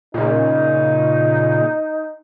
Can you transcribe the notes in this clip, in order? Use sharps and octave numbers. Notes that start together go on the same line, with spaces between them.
A#2 C#3 D#4